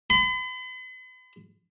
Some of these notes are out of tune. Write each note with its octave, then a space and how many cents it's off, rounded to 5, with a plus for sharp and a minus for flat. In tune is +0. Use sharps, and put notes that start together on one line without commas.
B5 +45